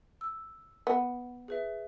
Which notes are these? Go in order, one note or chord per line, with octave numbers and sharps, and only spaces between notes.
E6
B3
G#4 B4 E5